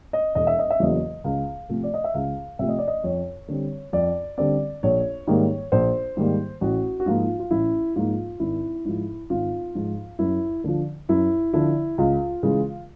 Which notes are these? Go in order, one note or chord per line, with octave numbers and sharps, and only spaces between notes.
D#5
E1 D#5
E5
D#5
E5
E2 C#3 F#3 A#3 D#5
C#2 F5
C3 F3 A3
D5
D#5
E5
C#2 F5
C3 F3 A3 E5
D#5
D5
D#5
F2 C#5
D3 G3 C4
F2 D5
D3 G3 C4 D5
A#1 C#5
G#2 D#3 G3 A#3
A#1 C5
G#2 D#3 G3 A#3
A1 F#4
F#4
G#2 F3 A#3 D#4 F4
F4
A1 E4
G#2 F3 A#3 D#4 F4
G#1 E4
G#2 F3
G#1 F4
G#2 F3
F#2 E4
D3 F3
F#2 E4
D3 F3 E4
C#2 F4
C#3 E3 G#3